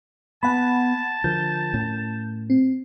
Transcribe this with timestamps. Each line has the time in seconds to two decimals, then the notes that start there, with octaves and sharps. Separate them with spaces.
0.43 B3 F#5 G#5 A5 B5
1.24 D3 F3 A#4 G6
1.74 A2 C#4
2.50 C4